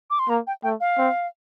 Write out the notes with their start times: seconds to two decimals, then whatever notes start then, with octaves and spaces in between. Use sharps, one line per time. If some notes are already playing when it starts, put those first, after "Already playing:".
0.10 D6
0.19 C6
0.29 A#3 A#5
0.47 G5
0.63 A3 G5
0.80 F5
0.98 C4